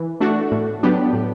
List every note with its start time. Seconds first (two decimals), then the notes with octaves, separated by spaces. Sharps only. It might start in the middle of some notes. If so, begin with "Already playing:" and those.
Already playing: E3
0.20 A3 D4 F#4
0.51 A2
0.83 F#3 B3 D4 G4
1.13 A2